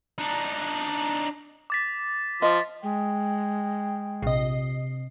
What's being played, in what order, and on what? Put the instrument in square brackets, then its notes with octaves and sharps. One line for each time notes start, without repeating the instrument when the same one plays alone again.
[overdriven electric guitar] D4 D#4
[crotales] D6 A6 B6
[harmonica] F3 C6 [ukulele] D#5
[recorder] G#3 [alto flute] G5
[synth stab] A#1 D#5 [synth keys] C3 C7